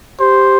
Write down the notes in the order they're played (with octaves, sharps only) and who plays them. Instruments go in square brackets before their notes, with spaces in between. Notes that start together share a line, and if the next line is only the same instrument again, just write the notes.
[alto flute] G4 [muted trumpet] C5